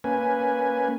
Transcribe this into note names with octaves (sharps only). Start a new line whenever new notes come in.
A#3 C#4 B4 G#5